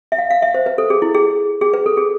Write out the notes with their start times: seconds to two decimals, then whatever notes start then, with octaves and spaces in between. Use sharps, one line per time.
0.12 E5
0.18 F5
0.31 F5
0.42 E5
0.54 C5
0.66 B4
0.78 A4
0.90 G#4
1.02 E4
1.14 G#4
1.61 G#4
1.74 B4
1.86 A4
1.97 G#4